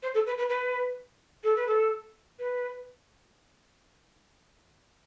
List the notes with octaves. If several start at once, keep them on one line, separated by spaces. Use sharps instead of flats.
C5
A4
B4
B4
B4
A4
B4
A4
B4